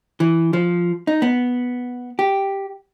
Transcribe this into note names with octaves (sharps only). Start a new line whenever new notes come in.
E3
F3
D#4
B3
G4